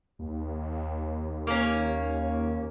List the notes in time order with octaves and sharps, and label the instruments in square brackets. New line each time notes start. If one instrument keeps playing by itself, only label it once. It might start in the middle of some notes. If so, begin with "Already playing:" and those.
[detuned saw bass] D#2
[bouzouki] A#3 C#4